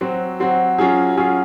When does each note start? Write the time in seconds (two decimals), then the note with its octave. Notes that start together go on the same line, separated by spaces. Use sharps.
0.01 F#3 C4 F#4
0.40 F#3 C4 F#4
0.78 F#3 C#4 F4 G#4
1.17 F#3 C#4 F4 G#4